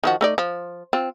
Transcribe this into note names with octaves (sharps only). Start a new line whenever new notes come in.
D#3 F3 F#4
A3 D#4 D5
F3
C4 F4